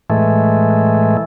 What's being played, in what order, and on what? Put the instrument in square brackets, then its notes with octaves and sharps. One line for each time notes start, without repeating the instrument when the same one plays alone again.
[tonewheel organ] A2 E3 G#3 A3